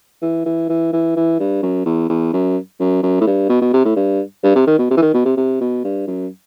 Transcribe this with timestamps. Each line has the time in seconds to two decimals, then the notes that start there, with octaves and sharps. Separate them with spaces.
0.22 E3
0.46 E3
0.69 E3
0.93 E3
1.16 E3
1.40 G2
1.63 F#2
1.86 E2
2.10 E2
2.33 F#2
2.80 F#2
3.03 F#2
3.21 A2
3.27 G2
3.49 B2
3.61 B2
3.73 C3
3.85 A2
3.96 G2
4.44 G2
4.55 C3
4.67 D#3
4.79 B2
4.90 C3
4.97 E3
5.02 D#3
5.14 B2
5.25 C3
5.37 C3
5.61 B2
5.84 G2
6.07 F#2